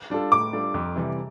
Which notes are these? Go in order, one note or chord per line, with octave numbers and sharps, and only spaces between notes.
G3 D4 F4 A4
A2 D6
G3 D4 F4 A4
F2
C3 E3 G3